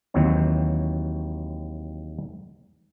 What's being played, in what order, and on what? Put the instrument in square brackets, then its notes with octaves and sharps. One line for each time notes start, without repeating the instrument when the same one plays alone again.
[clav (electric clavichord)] D#2 E3 F#3 C4 C#5